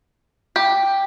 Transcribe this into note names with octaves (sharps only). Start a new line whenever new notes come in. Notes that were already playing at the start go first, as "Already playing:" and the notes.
G4